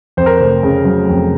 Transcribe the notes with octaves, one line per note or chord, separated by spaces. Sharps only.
F2 C5
A#4
F1 C5
C#3
F#3
F2